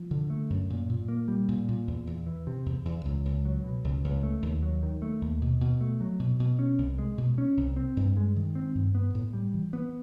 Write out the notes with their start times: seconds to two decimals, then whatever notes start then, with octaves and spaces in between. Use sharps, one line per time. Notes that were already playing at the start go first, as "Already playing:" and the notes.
Already playing: F3
0.11 D3
0.30 A3
0.50 F#2
0.70 A#2
0.89 A#2
1.08 A#3
1.28 G3
1.48 A#2
1.68 A#2
1.87 E2
2.07 E2
2.26 E3
2.47 C3
2.66 E2
2.85 E2
3.05 C#2
3.25 C#2
3.45 F#3
3.64 B2
3.84 C#2
4.04 C#2
4.23 A3
4.42 D#2
4.63 F#3
4.83 D#3
5.02 A3
5.21 D#2
5.41 B2
5.61 B2
5.81 A3
6.01 F#3
6.19 B2
6.40 B2
6.59 C#4
6.78 C2
6.98 G#3
7.18 B2
7.38 C#4
7.57 C2
7.77 C4
7.97 G2
8.17 G#3
8.36 D#3
8.55 C4
8.75 G2
8.95 B3
9.14 A2
9.33 G3
9.54 E3
9.73 B3